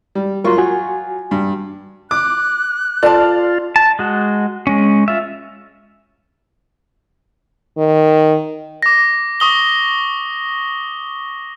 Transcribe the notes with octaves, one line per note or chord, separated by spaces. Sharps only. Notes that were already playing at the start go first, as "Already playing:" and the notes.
G3
F#3 F4 A#4 C6 C#6
F#4 G#5
G2
D6 F#6
F4 A4 C5 D5 A5
A5
G#3 F#4
G#3 C#4
F4 E5
D#3
D6 A#6
C#6 D#6 G7